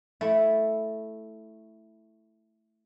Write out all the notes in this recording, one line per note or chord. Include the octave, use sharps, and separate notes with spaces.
A3 E4